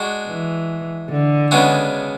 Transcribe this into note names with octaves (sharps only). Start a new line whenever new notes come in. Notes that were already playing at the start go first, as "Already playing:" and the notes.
Already playing: G#3 D4 F#4
E3
D3
C#3 G#3 B3 D4 F#4